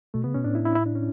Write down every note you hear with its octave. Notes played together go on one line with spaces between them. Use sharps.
B2 A3
C#3 B3
B2 C#4
A2 D4
E4
E4
E4
D4
C#4